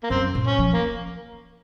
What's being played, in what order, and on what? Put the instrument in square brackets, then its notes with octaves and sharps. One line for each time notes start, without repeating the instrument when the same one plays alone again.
[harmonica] A#3
[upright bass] F#2 [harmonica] C4
[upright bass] A#2
[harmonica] C#4
[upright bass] F3
[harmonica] A#3